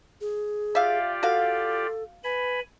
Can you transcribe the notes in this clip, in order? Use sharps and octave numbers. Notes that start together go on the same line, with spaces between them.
G#4
F4 G4 D5 E5 F5
F#4 A4 F5
B4 G#5 B5